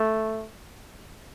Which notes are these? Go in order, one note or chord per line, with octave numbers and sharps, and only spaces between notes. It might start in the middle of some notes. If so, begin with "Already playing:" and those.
Already playing: A3